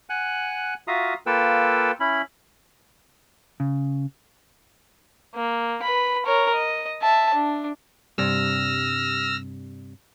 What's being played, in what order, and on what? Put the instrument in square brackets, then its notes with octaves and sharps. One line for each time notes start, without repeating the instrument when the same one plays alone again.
[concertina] F#5 G#5 F#6
F4 F#4 E5 F5 A#5 D#6
A#3 F4 A4 B4 G5 E6
C#4 E4 B5
[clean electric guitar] C#3
[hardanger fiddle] A#3
B4 B5
A#4 C#5
D#5
E5 A5
D4
[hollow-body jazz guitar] G2 C3 G3 [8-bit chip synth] E6 F6 A#6